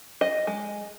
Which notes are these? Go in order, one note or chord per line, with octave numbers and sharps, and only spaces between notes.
D#5
G#3